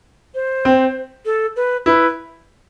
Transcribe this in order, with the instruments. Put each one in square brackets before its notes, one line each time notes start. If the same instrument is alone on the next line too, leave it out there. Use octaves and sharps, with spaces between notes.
[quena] C5
[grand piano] C4
[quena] A4
B4
[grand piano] E4 [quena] B4